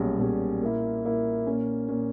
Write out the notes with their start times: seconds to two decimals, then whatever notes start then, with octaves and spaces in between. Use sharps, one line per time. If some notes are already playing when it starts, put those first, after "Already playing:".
Already playing: B1 A#2 G3 C#4 G#4
0.19 B1 A#2 G3 C#4 G#4
0.61 A#2 A#3 E4
1.04 A#2 A#3 E4
1.47 A#2 A#3 C#4
1.88 A#2 A#3 C#4